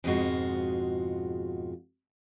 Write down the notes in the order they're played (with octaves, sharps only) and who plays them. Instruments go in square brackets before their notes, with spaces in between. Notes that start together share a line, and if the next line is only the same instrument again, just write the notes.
[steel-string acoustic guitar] F2 G#2 B2 G#3 F4 F#4